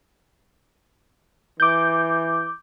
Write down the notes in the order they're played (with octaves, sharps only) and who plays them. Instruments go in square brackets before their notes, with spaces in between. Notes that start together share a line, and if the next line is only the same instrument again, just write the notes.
[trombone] E3 [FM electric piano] D6 G6